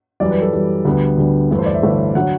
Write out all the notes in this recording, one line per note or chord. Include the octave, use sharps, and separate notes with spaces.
F#2 E3 G3 D5
B4
A4
F#2 E3 G3
D2 D3 G3 B3
D2 D3 G3 B3
G1 G2 E3 A3 B4
C5
D5
E5
G1 G2 E3 A3
D3 F#3 F#5